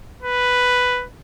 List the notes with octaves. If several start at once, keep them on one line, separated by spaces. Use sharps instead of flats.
B4